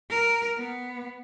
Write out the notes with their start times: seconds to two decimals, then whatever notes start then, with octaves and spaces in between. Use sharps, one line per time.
0.10 A#4
0.58 B3